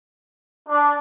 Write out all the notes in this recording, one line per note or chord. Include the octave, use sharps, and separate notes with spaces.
D4